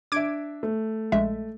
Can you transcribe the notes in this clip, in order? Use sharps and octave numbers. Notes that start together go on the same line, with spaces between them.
D4 E5 D6 G#6 D7
A3
A#1 G#3 E5